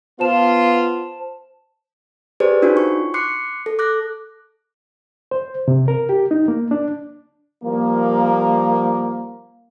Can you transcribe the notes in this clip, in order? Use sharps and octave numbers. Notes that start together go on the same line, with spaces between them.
B3 F4 C5 A5 E7
G4 G#4 B4 C5 D5
D4 D#4 F4 F#4 C#5
C#6
C6 D6 F#6 C7 C#7
A4
D6 F#6 A#6
C5
C3
A#4
G4
D#4
A#3
D4
F3 G3 A#3